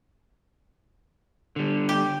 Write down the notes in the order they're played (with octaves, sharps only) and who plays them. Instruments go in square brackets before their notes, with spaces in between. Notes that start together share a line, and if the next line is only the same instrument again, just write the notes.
[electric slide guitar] D3 G3
[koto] G4